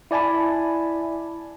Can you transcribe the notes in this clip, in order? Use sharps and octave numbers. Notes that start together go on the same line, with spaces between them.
E4 D5 G#5 A5 B5